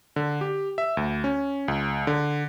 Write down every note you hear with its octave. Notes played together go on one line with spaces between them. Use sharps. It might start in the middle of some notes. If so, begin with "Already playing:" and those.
D3
G4
E5
D2
C#4
C#2
D3